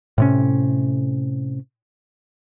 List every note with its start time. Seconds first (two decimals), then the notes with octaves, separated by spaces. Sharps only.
0.18 A2 C3 C#4